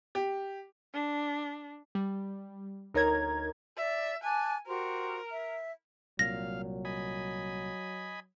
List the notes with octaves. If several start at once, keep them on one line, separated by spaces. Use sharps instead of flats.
G4
D4
G3
D2 D#4 A#4 C#5 A#5 G#6
D5 E5
G#5 A5 D6 F#6
F#4 G4 A#4 C5
E5
C2 A#2 F#3 F5 A#6
D#5 G#5 B5